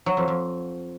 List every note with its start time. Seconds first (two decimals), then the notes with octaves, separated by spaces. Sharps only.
0.06 F#3
0.17 F2
0.28 F2